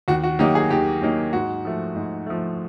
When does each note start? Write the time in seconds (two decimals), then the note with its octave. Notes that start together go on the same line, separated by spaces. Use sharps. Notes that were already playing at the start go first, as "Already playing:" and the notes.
0.08 D#2 F#4
0.23 F#4
0.39 D#3 F#3 A#3 D#4 G4
0.55 G#4
0.70 D#2 G4
1.01 D#3 F#3 A#3 D#4
1.33 G#2 F#4
1.65 F3 A3
1.96 G#2
2.26 F3 A3